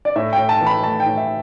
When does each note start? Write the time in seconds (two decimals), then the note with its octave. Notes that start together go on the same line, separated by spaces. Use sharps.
0.05 D5
0.16 A2 E5
0.33 A2 G5
0.49 A5
0.61 E3
0.66 B5
0.83 A3 A5
1.00 G5
1.06 A2
1.17 E5